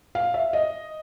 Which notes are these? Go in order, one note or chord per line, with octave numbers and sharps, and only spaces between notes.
F5
E5
D#5